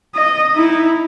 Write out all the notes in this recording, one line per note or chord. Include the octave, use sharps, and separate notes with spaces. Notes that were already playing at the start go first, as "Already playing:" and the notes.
D#5
D#4 E4